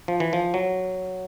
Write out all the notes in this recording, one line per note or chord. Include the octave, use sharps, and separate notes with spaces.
F3
E3
F3
F#3